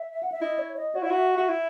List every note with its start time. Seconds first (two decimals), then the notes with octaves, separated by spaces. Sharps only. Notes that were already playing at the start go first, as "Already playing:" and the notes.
Already playing: E5
0.23 F#5
0.32 E5
0.41 E4 D#5
0.59 C#5
0.77 D#5
0.95 F#4 C#5
1.02 E4 F#5
1.10 F#4 E5
1.31 E5
1.37 F#4
1.48 E4